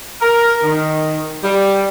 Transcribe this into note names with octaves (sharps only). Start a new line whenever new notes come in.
A#4
D#3
G3